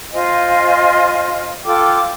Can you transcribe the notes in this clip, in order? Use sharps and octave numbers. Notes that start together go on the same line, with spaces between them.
F4 C5 D#5 G#5
F4 A4 G5 D6